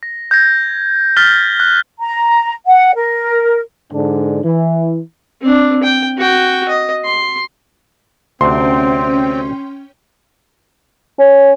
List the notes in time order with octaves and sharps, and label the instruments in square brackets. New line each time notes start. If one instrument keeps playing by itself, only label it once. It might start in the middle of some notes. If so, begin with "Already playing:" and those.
[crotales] A#6
G6 G#6 A#6
F6 G6 A6 B6 G7
F#6
[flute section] A#5
F#5
A#4
[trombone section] G#2 D3 D4
E3
[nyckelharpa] C4 D4
G5
F#4 G5
D#5
C6
[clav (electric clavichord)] D2 C3 [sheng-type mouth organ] C4 [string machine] C#4 G5 [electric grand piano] C6
[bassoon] C#4